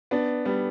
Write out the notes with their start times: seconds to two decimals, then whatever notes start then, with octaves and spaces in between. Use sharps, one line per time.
0.11 B3 D4
0.45 G3 B3